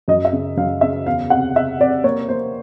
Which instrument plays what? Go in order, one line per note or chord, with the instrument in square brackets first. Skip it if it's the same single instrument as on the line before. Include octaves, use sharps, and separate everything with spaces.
[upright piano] F#2 D#5
E5
C#3
F#2 F5
C#3 E5
E2 F5
C3 F#5
C3 E5
C3 D5
A#3 C#5
A#3 C5